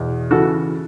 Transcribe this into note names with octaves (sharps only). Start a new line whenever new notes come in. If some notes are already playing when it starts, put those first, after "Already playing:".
Already playing: E2 B2
C#3 E3 F#4 A4